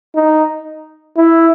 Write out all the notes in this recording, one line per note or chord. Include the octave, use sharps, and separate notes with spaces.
D#4
E4